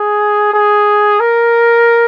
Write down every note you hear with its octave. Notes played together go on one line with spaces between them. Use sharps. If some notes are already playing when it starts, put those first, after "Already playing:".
Already playing: G#4
G#4
A#4